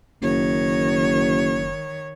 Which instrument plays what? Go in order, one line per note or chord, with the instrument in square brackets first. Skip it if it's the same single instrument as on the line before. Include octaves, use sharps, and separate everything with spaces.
[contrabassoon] F#1 [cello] D#3 C#5